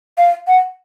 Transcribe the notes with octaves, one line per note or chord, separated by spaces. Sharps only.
F5
F#5